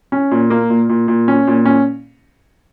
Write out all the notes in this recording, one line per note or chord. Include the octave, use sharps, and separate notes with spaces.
C#4
A#2
A#3
A#2
A#2
A#2
C#4
A#2
C#4